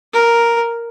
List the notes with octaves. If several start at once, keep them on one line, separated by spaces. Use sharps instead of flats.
A#4